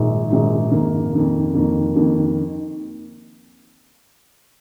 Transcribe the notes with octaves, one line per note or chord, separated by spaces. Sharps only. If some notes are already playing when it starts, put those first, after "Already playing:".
Already playing: A#1 G#2 D#3 G#3 D#4
A#1 G#2 D#3 G#3 D#4
F2 D#3 A#3
F2 D#3 A#3
F2 D#3 A#3
F2 D#3 A#3